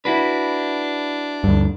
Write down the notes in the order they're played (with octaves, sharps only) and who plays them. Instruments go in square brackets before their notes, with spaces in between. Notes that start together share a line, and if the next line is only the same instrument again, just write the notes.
[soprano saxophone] D4 [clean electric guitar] E4 F#4 B4
[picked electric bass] D2 G2